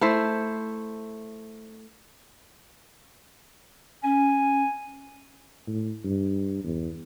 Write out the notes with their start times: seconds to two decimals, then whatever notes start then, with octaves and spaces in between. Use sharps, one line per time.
0.01 A3 E4 C5 E5
4.03 C#4 G#5
5.67 A2
6.04 G2
6.64 E2